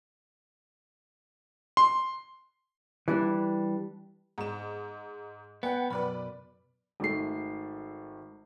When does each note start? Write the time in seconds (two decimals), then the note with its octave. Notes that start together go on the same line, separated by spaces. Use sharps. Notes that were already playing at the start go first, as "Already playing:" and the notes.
1.77 C6
3.08 E3 G3 D4
4.38 G#2 E7
5.63 B3 F#5 G5
5.90 B1 F#2 B4 D5 B5
7.00 G#1 A3 C7